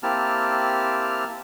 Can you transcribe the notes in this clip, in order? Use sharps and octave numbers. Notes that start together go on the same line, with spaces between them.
A#3 C4 E4 G4 A5 F6